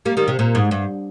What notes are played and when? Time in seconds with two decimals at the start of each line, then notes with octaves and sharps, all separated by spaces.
0.05 G3 A#3
0.17 D#3 G3
0.28 C3
0.39 A#2
0.55 G#2
0.71 G2